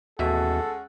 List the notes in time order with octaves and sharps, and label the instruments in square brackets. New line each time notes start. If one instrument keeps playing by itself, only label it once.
[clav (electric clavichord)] A1 B2 E5 [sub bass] D#2 [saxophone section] G#3 C#4 F#5 [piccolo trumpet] A4